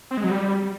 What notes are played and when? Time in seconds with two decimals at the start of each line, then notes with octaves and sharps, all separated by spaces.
0.11 C4
0.17 G#3
0.24 F#3
0.30 G3